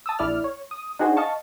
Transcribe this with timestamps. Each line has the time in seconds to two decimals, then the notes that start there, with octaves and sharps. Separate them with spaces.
0.06 A5 D#6 E6
0.19 A#1 E4 D5 F6
0.44 C#5
0.71 D#6
0.99 D4 D#4 F#4 G#4 C5
1.17 D#5 F5 A5 C#6